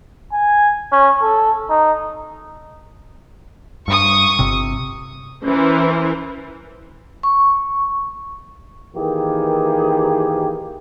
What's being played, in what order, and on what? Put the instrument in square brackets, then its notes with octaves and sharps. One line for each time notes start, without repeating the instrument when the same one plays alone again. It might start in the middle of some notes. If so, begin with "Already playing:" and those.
[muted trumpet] G#5
C#4
A4
D#4
[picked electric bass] G2 [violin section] C#6 D#6
[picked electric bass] G1 C3
[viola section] E3 A#4 C5 [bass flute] C#4
[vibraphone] C#6
[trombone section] D#3 E3 A#3 G4 G#4